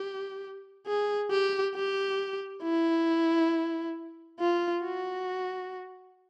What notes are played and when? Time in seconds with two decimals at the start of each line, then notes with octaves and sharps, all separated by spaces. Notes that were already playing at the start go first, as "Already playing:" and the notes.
Already playing: G4
0.87 G#4
1.31 G4
1.75 G4
2.63 E4
4.40 F4
4.83 F#4